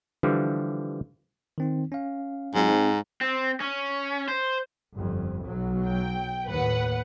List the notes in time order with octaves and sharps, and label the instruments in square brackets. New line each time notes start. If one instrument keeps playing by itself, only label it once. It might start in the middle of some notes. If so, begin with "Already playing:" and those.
[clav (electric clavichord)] D3 E3 F3 G3
[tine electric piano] D#3 C4 D#4
C#4 F5
[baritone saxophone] G#2 [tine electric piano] F#3 C4 F4
[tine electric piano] C4 D#4 G#4
[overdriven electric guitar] C4
C#4
C5
[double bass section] G1 F2
B1 F#3
[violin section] G5
[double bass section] D#2 A2 [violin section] B4 F#5